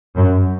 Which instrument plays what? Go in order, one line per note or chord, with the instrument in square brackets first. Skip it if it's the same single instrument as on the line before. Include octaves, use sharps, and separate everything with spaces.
[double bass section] F#2